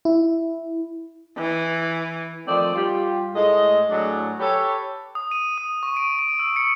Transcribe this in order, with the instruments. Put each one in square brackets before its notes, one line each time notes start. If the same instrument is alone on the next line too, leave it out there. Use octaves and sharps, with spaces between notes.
[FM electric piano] E4
[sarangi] E3
[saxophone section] D#3 F3 A3 C4 D5
G3 F4 G4
A2 G#3 A3 D#5
A2 F#3 A3 D4 G#4 A4
G4 A4 B4 C#5
[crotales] D#6
D#7
D#6
C#6
D7
D7
E6
C#7